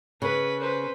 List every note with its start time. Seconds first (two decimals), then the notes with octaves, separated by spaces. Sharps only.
0.22 C#3 B4
0.60 B4 C5